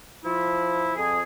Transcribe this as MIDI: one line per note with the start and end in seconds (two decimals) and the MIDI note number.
0.25 0.92 53
0.25 0.92 64
0.96 1.21 41
0.96 1.21 68